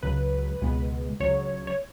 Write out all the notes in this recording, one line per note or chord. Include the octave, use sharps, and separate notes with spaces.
C#2 C#3 F#3 B4
C#2 B2 G#3 B3
C#2 C#3 F#3 C#5
C#5